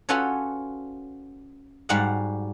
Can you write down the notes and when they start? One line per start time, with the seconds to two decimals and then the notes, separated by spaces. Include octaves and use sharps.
0.09 C#4 F4 F#4 A4 B4 C#5
1.89 G#2 G3 F#4 D5 F5 F#5